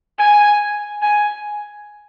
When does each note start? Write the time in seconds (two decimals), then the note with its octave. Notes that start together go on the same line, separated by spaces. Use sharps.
0.19 G#5
1.02 G#5